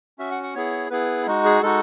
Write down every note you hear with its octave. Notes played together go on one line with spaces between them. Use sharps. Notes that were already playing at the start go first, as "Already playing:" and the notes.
C#4 F#4 E5
F#5
F#5
B3 E4 G#4 C#5
B3 E4 G#4 B4
G#3 D#4 F#4
G#4
G#3 D#4 F#4 A4